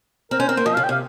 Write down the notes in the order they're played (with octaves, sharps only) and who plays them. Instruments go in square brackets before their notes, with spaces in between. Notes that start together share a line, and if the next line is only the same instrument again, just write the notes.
[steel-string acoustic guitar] C4 [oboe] A#4
[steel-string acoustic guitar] C#4 [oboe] C5
[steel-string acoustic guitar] C4 [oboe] A#4
[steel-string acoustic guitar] A#3 [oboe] C5
[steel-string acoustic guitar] F3 [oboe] D#5
[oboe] F5
[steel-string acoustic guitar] C#3
[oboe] G5
[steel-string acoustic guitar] C3 [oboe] F5